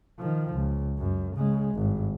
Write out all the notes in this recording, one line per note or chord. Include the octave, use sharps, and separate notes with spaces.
D#3 F3
C#2
F#2
C#3 G#3
G#1 G2